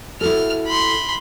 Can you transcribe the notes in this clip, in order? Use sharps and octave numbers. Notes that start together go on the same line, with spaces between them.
E4 F#4 A4 F6
B5 C6